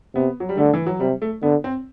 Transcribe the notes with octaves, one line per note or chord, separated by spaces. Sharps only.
C3 B3
F#3
G3
D3 A3
E3
F#3
C3 G3
A3
D3 B3
C4